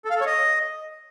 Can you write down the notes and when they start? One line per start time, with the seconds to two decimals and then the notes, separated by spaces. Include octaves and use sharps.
0.05 A4
0.10 F5
0.16 A4
0.21 C#5
0.26 D#5